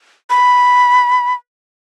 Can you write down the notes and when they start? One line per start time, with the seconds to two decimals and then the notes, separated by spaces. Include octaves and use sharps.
0.30 B5